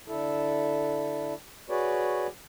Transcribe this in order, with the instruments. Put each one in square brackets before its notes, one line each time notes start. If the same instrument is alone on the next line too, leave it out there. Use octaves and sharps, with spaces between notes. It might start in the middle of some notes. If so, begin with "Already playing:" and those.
[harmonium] D3 E4 A4
F#4 G#4 B4 C#5 D5